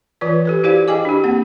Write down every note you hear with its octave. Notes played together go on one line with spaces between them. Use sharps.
E3 F4 B4 D5
G4 A4 B4
E4 F#4 G4 C5 D5 F5
G#4 D#5 G5 G#5 D6
D4 G4
A#3 C4 F#5